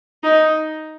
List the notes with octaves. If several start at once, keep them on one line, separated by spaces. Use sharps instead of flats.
D#4